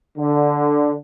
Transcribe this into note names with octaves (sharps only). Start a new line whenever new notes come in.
D3